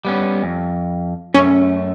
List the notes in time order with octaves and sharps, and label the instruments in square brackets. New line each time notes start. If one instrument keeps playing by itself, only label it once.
[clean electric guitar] G3 B3 C#4
F2
[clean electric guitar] F#2 A3 [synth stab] C#4